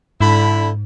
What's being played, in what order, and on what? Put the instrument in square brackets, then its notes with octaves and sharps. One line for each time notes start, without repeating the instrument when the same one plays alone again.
[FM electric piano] G#2 [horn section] D3 E4 B5